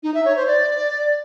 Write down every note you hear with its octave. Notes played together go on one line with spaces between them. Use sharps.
D#4
E5
C#5
C5
D5